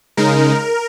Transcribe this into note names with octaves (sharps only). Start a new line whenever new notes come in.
C#3 G#3 D#4 A#4